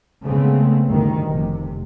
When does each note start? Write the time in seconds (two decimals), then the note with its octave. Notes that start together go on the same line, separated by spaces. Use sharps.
0.24 C#3 G#3 A3 B3 C4
0.87 G1 D2 G2 D#3
1.26 F1 C3